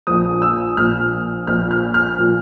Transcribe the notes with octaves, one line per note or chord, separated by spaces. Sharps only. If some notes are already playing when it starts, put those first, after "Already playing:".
A#1 A#2 F3 D#6
E6
A#1 A#2 F3 F6
A#1 A#2 F3 F6
F6
F6
A#2 F3